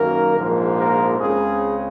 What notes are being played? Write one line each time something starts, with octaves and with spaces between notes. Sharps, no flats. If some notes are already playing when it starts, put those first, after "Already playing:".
Already playing: F#2 D#3 A#3 A#4
A#1 G#2 F3 A#3
A#4
C#2 C#3 G#3 C4 G#4